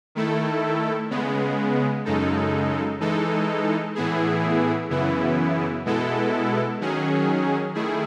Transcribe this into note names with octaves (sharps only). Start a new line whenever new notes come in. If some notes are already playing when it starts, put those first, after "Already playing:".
D#3 A3 E4 A4
C#3 G#3 B3
F#2 C#3 G#3 D#4 A4
E3 G#3 D#4 A4
A2 E3 B3 E4 G#4
F#2 C#3 E3 B3 E4
B2 G#3 B3 E4 A4
D#3 F#3 C#4 G#4
D#3 A3 E4 G#4